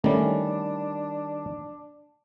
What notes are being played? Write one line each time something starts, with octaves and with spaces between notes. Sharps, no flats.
D#3 G3 A3 C#4 D4